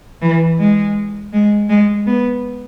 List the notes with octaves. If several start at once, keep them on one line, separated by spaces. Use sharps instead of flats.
E3
G#3
G#3
G#3
B3